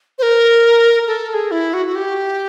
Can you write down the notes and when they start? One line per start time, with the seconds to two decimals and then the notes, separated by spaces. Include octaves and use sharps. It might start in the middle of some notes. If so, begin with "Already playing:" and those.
0.19 C5
0.23 A#4
1.07 A4
1.29 A4
1.34 G#4
1.51 E4
1.74 F#4
1.86 F#4
1.96 G4